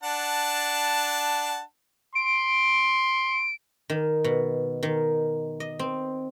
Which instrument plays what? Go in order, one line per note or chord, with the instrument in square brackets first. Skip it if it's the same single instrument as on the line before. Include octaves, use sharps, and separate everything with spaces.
[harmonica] D4 F#5 A5
[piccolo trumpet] C6 [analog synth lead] D7
[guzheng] D#3
B2
D#3
D#5
C4